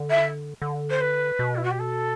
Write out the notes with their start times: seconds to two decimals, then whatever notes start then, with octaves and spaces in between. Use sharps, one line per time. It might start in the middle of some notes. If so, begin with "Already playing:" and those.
Already playing: D3
0.10 E5
0.62 D3
0.90 C5
1.00 B4
1.39 B2
1.55 E4
1.63 F#4
1.70 G4
1.79 A4